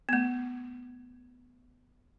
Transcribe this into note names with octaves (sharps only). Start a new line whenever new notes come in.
A3 B3